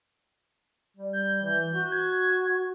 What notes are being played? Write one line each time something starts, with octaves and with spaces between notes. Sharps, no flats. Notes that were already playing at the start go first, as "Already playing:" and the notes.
G3
G6
E3
F#4
G#6